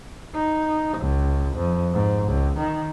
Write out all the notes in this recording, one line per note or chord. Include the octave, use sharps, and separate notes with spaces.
D#4
C#2
F2
G#2
C#2
D#3